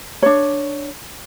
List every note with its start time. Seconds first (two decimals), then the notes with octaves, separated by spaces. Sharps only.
0.22 D4 C#5